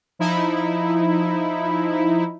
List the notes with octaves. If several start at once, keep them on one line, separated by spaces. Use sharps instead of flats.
F3 D#4 E4